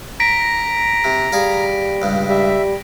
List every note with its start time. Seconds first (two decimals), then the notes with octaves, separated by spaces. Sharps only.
0.20 A#5 A#6 B6 D7
1.04 C3
1.32 G3 G#4 F5
2.02 C#2 G2
2.29 G3 E5